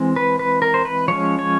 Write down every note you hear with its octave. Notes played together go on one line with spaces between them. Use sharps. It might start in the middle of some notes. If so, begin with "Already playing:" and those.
Already playing: E3 G#3 C4
B4
B4
A#4
C5
B4
F3 G#3 C#4 C#5
C#5